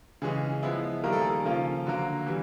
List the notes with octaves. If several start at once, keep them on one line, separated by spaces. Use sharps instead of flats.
C#3 E3 G#3 C#4 G#4
F3 G#3 B3 E4
D#3 G3 A#3 A#4
A4
G#4
A4
C#3 F3 A#3 C#4 F4
D3 F#3 A#3
E3 G3